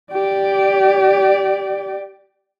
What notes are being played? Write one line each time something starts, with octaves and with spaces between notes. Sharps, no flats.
G4 D5